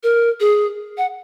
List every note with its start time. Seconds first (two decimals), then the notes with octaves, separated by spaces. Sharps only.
0.03 A#4
0.40 G#4
0.98 F#5